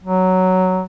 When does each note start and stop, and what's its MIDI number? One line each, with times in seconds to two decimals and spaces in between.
0.04 0.83 54